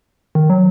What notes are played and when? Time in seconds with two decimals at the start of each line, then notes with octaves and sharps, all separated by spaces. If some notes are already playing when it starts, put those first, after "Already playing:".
0.35 D#3
0.50 F#3